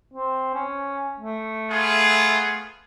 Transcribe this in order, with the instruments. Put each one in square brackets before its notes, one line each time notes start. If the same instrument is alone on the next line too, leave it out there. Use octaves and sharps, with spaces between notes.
[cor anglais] C4
C#4
A3
[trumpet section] B3 F4 G#4